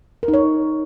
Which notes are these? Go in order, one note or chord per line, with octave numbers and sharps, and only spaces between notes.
A#4
D#4
C#5